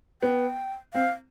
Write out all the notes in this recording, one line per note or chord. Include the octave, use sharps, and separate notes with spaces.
B3 G5
C4 F5